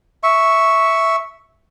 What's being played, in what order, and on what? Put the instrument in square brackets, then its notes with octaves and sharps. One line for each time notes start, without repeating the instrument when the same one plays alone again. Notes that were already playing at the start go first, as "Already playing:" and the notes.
[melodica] E5 C#6